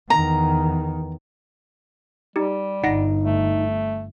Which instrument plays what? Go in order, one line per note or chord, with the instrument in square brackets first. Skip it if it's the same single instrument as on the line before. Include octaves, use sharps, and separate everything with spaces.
[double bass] E2 D#3 [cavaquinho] A#5
[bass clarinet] G3 [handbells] D#4 G4
[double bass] G1 [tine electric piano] D#4 [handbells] F#5 A#6
[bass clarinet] A3